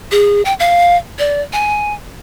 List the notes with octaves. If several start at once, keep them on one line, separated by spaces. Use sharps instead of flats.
G#4
G5
F5
D5
G#5